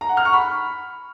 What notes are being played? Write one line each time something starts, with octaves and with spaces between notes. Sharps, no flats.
A#5
F#5
F6
C#6
B5